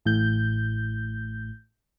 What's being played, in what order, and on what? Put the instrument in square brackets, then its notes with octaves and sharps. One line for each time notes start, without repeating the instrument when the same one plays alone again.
[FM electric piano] A1 A2 G6